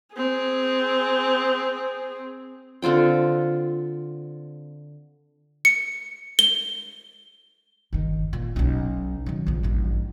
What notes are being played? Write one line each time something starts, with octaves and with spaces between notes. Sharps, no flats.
C4 G#4
D3 C4 F4 G5
C#7
G7
G1 D#3
A#2
B1 C#4
D#3 F#3
A#1 F2
A1 G2